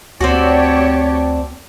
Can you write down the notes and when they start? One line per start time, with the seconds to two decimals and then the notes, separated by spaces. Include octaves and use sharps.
0.21 D2 C4 D4 F#4 G4 C#5 D5